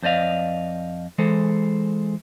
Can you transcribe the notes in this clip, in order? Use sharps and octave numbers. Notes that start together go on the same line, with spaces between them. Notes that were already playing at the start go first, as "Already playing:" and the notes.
F2 C5 D5 D#5 F5
E3 G#3 A4 C5